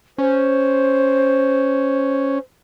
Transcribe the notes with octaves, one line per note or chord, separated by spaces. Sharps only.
C#4 C5